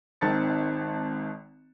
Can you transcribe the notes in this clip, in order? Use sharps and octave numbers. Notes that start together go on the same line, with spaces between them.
G#1 D#3 C4 A5 A6 C#7